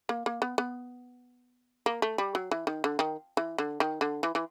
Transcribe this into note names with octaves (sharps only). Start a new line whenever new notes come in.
A#3
A#3
B3
B3
A#3
A3
G3
F#3
E3
D#3
D3
D#3
E3
D3
D#3
D3
E3
E3